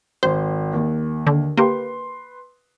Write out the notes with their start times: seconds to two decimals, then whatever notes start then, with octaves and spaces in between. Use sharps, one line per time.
0.23 G#1 C5
0.73 D#2
1.27 D3
1.57 A#3 G4 B4 C6